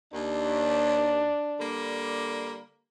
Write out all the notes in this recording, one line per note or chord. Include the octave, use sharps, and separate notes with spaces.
D#2 D4
D3 G3 A#3